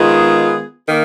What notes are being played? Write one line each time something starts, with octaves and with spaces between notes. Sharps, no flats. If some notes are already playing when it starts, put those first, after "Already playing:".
Already playing: D#3 G#3 B3 F4 G#4
D#3 A#3